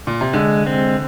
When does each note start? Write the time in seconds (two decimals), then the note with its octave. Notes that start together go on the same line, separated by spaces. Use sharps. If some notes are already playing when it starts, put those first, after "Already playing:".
0.07 A#2
0.21 C3
0.33 D3 G#3
0.66 C4